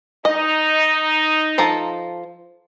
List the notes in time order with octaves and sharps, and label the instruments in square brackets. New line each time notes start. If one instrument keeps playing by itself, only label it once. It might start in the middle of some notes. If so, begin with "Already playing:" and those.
[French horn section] D#4 [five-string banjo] D#5
[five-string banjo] F3 A4 A#5